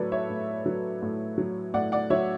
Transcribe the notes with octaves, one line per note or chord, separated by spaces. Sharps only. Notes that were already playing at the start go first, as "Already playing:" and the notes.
Already playing: A2 F#3 A4 B4 C#5 D5
C#5 E5
A2
F#3
A2
F#3
A2 D5 F#5
D5 F#5
F#3 C#5 E5